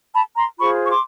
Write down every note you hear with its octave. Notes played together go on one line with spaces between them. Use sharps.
A5 B5
A#5 C6
F4 G#4 C5 B5 C#6
C#6
C6 D6